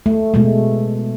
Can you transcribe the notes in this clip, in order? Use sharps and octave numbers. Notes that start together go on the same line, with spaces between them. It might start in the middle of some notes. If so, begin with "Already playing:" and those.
A3
B2 G#3 A3